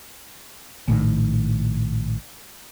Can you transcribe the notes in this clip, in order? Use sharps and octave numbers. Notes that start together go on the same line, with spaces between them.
A#1 A2 D3 D#3